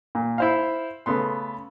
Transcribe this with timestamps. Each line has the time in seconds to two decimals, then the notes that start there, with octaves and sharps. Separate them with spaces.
0.15 A#2
0.38 E4 C5 F5
1.06 C#3 A3 B3 C6